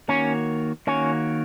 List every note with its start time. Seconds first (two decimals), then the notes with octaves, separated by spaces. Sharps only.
0.09 D#3 A#3 C#4 F#4 C#5
0.87 D#3 A#3 C#4 F#4 C#5